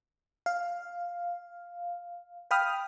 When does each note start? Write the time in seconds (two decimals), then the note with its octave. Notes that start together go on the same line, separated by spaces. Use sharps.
0.46 F5
2.51 F5 G5 B5 D#6 F6